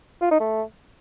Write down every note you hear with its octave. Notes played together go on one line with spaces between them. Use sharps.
F4
D#4
A3